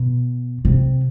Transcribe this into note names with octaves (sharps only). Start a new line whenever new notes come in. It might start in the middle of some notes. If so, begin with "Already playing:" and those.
Already playing: B2
C3